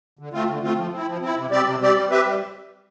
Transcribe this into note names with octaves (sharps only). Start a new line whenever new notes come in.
D3
A3 C4 F4
D3
A3 C4 F4
F3
C4 E4
F3
C4 E4
C3
G3 C4 G4 D5
C3
G3 C4 G4 D5
G3
C4 G4 B4 E5
G3